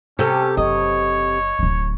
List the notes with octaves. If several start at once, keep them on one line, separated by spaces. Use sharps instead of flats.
C3 C#4 G4 A4
F#1 C#5 D#5
D1 D3